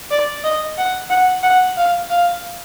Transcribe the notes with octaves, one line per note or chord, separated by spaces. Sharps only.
D5
D#5
F#5
F#5
F#5
F5
F5